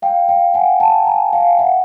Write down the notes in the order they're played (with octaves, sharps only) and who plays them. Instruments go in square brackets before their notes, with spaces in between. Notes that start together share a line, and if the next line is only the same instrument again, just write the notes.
[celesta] F5 G5
F5 G5
F#5 G#5
G5 A5
G#5 A#5
F5 G5
E5 F#5